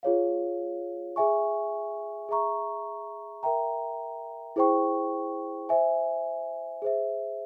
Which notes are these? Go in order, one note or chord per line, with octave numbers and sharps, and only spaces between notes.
F4 G#4 C#5 F5
G#4 E5 G#5 C#6
G#4 E5 A#5 C#6
A#4 E5 G5 A#5
E4 G#4 C5 G5 C#6
C5 E5 G#5
G#4 C5 E5